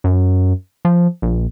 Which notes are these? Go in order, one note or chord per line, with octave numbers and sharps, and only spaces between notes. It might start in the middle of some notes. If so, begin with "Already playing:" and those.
F#2
F3
A#1